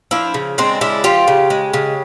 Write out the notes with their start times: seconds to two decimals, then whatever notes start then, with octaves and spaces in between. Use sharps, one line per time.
0.11 F3 D4 E4
0.34 C#3
0.58 G#3 C4 D4
0.81 C#3 D4 E4
1.04 F3 F4 G4
1.28 C#3
1.50 G#3
1.74 C#3